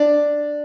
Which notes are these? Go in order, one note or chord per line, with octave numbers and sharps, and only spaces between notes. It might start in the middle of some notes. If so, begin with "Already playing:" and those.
Already playing: D4 D5